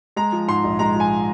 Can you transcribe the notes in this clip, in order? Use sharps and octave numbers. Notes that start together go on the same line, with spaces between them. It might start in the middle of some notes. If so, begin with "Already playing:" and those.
G#3 A#5
F3
G#2 C6
A#1
G#3 A#5
F3
G#5